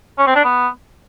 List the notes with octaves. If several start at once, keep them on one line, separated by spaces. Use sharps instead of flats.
C#4
C4
D4
B3